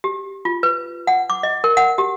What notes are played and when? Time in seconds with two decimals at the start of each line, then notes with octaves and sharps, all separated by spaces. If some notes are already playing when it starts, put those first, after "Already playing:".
0.04 G4
0.45 F4
0.63 B4
1.07 F#5
1.30 D6
1.43 D#5
1.64 A#4
1.77 F#5
1.98 G4